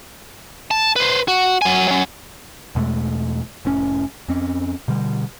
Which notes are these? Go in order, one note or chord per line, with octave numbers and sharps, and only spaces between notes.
A5
B4 C5
F#4
F#3 G#5
F#3 C#4
E2 B2 G#3 A3
F1 A2 C#4
F2 C4 C#4
B2 D3 G3